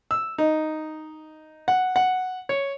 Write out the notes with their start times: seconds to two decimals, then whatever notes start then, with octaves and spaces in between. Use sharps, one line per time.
0.11 E6
0.38 D#4
1.68 F#5
1.96 F#5
2.49 C#5